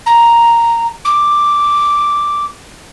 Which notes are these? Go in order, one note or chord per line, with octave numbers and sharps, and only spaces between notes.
A#5
D6